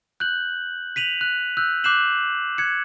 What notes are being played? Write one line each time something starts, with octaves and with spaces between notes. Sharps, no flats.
F#6 G6 F#7
B6 D#7 F7 F#7
F#6
E6 F#6 G6
D6 F#6 G6 C7 E7 F#7
F#6 G#6 C#7